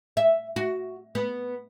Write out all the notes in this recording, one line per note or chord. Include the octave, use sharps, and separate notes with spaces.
E5
F#4
B3